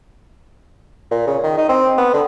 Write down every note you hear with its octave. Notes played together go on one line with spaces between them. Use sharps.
A#2
C#3
D#3
D#4
C4
B3
D3